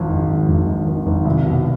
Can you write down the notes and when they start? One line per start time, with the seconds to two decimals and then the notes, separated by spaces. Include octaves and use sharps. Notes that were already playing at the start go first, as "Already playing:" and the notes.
Already playing: G#1 F3
0.09 G#2
0.29 G#1
0.48 G#1
0.67 G#1
0.87 G#1
1.06 G#1
1.25 C2
1.46 B2